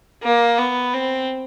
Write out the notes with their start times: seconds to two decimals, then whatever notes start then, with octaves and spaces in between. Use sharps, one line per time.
0.23 A#3
0.59 B3
0.94 C4